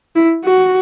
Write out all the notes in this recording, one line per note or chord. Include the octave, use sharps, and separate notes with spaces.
E4
F#4